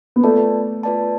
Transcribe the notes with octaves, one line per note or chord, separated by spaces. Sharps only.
B3
A3 F4 B4 D5 A5
F4 B4 D5 A5